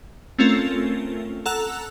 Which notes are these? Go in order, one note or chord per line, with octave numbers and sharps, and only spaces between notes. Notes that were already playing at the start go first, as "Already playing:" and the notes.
A3 C4 C#4 F4 A4 A#4
A4 F#5 A#5 E6 F#6 F7